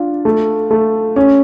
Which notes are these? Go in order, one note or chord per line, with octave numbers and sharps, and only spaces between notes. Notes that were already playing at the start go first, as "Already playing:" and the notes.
Already playing: D4 F4
A3
A3
C#4